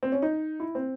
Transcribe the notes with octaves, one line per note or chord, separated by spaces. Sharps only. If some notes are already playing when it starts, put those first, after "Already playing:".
C4
C#4
D#4
E4
C4